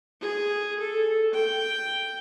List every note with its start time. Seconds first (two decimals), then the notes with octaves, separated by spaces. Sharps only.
0.21 G#4
0.80 A4
1.34 G5